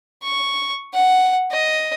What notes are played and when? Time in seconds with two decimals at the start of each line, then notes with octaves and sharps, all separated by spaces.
0.23 C#6
0.94 F#5
1.52 D#5